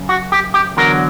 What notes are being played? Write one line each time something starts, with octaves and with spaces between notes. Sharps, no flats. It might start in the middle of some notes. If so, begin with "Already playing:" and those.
Already playing: F#2 C#3
F#4
G4
G4
E2 D3 F#3 A#4